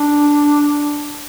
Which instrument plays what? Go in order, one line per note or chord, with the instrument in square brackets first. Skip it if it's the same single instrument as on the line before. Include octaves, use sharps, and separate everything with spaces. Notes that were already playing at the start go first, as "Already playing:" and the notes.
Already playing: [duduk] D4